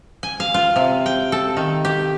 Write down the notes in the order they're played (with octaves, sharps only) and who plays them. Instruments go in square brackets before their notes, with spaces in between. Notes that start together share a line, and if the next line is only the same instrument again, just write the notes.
[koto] G#5
F5
F4
C3
G5
A4
D#3
G4